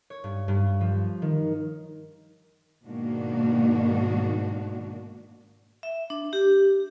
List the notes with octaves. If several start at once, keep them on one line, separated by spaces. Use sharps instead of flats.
C#5
G2
G2
F3
D#3
G#2 B2 D#3 A#3 D4 F#4
E5
D4
G4